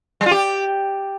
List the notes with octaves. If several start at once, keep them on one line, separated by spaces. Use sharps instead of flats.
G3
F4
G4